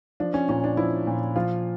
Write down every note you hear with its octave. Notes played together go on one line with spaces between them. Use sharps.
F3 D4
C#4
A#2 C#4
D4
F3 E4
A#2
F3 F4